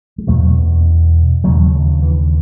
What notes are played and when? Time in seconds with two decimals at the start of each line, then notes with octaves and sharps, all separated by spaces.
0.18 G#3
0.27 E2 B2 F#3 A3
1.44 D#2 C#3 F#3 A3
2.02 E3